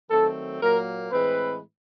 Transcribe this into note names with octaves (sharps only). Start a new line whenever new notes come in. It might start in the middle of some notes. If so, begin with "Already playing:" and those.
D#3 F#3 A3 C4 A4
A#2 F#3 A#3 A#4
A2 E3 G#3 C4 B4